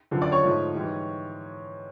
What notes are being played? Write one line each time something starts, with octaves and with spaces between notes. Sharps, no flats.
F#2 D3 F3
D5 D6
C#5 C#6
G#2 F3 A3
G#2 E3 G3